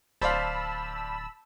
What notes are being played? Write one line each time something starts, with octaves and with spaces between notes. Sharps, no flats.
D1 C5 D5 F5 A5 B5 E6